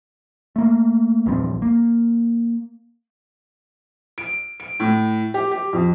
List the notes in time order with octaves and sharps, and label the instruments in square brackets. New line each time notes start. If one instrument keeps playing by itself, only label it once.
[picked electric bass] A3 A#3
A#1 E2 G2 C4
A#3
[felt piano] D7
D7
A2
G4
G4
F2